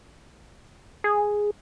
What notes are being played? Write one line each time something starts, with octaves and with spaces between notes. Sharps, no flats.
G#4